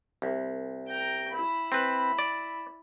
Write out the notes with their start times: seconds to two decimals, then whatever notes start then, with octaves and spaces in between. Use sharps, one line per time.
0.22 C2
0.87 G5 A#5
1.32 E4 B5
1.72 C4 B4
2.19 D5